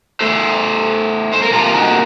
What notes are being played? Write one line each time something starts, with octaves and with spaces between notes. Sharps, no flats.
A2 A3 A4 C5
C5
A#4
C3 F3 A#3 F4 A4
D#4 F#4